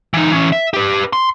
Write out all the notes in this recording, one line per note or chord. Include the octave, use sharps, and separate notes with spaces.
E3 D#4
E3 C#4
E5
G4 B4
C6